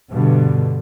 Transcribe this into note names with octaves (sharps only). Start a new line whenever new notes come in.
G2 B2 D3